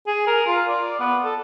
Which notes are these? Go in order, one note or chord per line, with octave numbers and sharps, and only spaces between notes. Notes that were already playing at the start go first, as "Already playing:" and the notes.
G#4
A#4
F4
D5
B3
A4